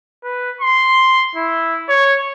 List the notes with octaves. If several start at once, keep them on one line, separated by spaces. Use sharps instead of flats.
B4
C6
E4
C#5